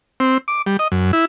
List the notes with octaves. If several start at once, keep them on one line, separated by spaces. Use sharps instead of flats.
C4
D6
G3
D#5
F#2
E4